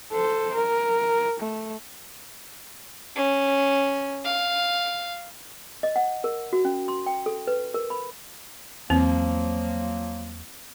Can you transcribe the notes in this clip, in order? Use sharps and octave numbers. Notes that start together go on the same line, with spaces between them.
A4 C5
A#4
A3
C#4
F5
D#5
F#5
A#4
F#4
C#4
C6
G5
A4
B4
A#4
B5
E2 F3 F#3 A#3 C4